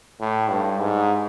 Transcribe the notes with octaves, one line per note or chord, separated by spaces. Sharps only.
A2
G2
G#2